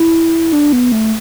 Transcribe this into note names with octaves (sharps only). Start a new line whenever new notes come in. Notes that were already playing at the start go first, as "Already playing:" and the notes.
Already playing: E4
D4
B3
A3